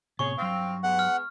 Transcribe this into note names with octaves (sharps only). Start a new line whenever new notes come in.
A2 C3 B3 G#4 C#5 C#6
G2 F#3 C4 F5
G#3 B3 F#5
F6